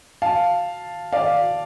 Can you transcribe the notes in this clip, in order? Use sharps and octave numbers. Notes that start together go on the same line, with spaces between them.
F5 A5
D5 F5